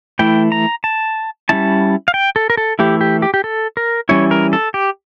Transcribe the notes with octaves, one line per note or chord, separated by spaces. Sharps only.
E3 A3 E4 G5
A#5
A5
G3 C#4 E4 A5
F5
G5
A4
A#4
A4
E3 A3 E4 G4
G4
G4
G4
A4
A#4
E3 G3 C#4 E4 C#5
A#4
A4
G4